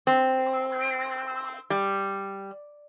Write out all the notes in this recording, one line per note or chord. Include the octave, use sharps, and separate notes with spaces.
C4
G3